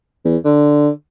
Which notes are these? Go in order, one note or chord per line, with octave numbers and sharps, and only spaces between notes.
E2
D3